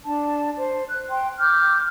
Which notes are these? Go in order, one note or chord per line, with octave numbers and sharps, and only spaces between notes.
D4 A5
C5
F#6
G5 C6
D6 F6 G6